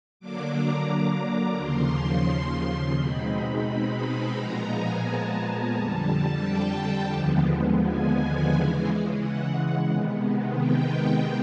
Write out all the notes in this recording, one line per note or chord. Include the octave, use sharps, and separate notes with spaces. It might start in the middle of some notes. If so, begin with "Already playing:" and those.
D3 F#3 A#3 D4 D6
A#5
D#2 C#3 F3 C6
B2 G#3 C4 D#4 B5
A#2 F3 G#3 B3 A#5
G#5
A5
F2 D3 G3 A5
G5
D#2 D3 F3 G#3 B3
G#5
C#3 E3 G#3
F#5
C3 D#3 G#3 B3
G5